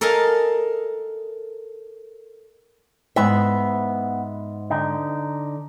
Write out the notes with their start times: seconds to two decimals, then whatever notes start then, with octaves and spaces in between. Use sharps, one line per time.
0.01 A4 A#4 D#5 F5 G#5
3.16 G#2 B3 E5
4.70 D3 D#4